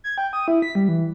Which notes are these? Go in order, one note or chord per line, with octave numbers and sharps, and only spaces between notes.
G#6
G5
D#6
E4
B6
G3
E3